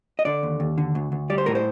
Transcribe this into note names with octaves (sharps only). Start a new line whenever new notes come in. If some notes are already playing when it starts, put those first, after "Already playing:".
D#5
D3 D5
D#2
D#2
D3
D2
D2
G3 D5
C5
A2 A#4
C5